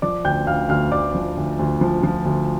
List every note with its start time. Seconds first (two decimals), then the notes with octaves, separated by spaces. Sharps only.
0.02 F3 D5 D6
0.24 D2 G5 G6
0.47 D2 F5 F6
0.69 D2 F5 F6
0.91 D2 D5 D6
1.15 F3
1.37 D2
1.59 D2
1.81 F3
2.03 F3
2.25 D2